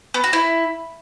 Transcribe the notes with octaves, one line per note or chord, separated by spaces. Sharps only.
B3
F#4
E4